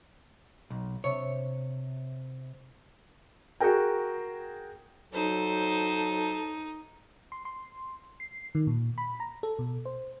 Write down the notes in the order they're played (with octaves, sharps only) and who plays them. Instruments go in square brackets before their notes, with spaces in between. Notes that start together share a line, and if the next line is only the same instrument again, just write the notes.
[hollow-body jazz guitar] B1
[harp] C3 [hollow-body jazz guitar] C#5
[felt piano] F#4 G#4 A#4 G5
[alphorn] F#3 [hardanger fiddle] D#4 [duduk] A4 [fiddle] C5
[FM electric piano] C6
C6
C7
D#3
A#2
B5
A#5
A4
B2
C5